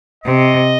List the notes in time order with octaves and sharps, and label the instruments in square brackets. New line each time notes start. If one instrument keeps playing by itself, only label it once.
[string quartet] C3 [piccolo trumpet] D#5